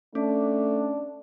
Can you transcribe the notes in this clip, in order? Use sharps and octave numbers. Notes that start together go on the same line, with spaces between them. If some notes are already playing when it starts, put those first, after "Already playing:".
A3 C#4 D4